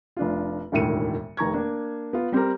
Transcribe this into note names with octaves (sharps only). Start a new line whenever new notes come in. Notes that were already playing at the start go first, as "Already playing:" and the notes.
F1 D4 F4
E1 D2 A2 D#3 C#7 D#7
F1 D#3 A#5 C#6 G#6
A#3 D4
B3 F4
G3 C4 G4 A#4